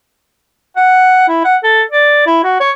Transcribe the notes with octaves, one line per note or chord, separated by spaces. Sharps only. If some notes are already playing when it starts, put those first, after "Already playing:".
F#5
E4
F#5
A4
D5
E4
F#4
C#5